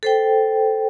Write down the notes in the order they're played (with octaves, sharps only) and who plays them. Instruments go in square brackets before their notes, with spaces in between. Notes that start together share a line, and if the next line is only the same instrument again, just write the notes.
[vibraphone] A4 C5 G5